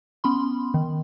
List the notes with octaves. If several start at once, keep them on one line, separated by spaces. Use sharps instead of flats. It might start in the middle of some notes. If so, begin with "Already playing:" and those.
B3 C#4 B5 C6
D#3